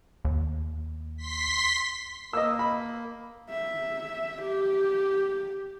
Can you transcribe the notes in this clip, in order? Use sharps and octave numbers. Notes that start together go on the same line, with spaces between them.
D#2
C6 B6
A#3 D#5 E6
B5
E5
G4